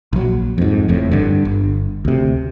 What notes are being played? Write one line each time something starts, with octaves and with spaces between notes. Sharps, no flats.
A#1 F#3
F2 G#2
F#1 F2 A2
G2 D3
G1
D2 C3